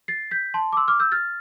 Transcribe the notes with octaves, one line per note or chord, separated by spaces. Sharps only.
A6 C7
G6 B6
A5 C6
D6
C6 E6
D6 F6
E6 G6
F6 A6